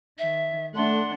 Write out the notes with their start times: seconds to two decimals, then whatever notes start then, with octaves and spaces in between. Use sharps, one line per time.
0.19 D#3 E5
0.75 A3 D4 F#5 C6